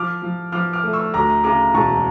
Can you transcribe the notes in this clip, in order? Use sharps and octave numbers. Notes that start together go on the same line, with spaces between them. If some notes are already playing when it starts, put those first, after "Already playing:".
Already playing: F3 D6 F6
F3
F3 D6 F6
D6 F6
A3
C#6 E6
D2 A#5 D6
C#3 A#5 D6
E1 A5 C#6